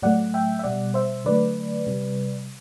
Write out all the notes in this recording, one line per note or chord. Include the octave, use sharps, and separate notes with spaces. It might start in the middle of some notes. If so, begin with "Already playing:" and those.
A2 F#3 A3 D5 F#5
E5 G5
E5
B2 G3 D5 F#5
C5 E5
D3 F#3 A3 B4 D5
C3 G3